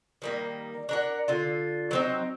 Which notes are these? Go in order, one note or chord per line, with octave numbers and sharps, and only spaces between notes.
D#3 G3 A#3
D4 A#4 F#5
D3 F4
F#3 C4 D#4